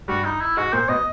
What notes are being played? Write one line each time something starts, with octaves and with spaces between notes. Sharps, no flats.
G2 G3 F#4
D#4
E4
G#2 G#3 F#4
A#2 A#3 C5
B2 B3 D#5